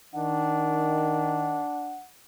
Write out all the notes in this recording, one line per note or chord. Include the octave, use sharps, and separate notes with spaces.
D#3 D4 F#5